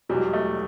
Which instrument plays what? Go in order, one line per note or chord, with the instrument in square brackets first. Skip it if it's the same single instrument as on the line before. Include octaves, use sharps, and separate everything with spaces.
[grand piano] E1 E2 B2 F#3 G3
A3